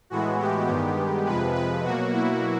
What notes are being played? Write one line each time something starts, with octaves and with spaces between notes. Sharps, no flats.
A2 E3 G#3 B3 F#4
G4
G2 D#3 G#3 B3
F2 C3 F3 G#3 B4
B4
B2 F#3 A#3 F#4
E4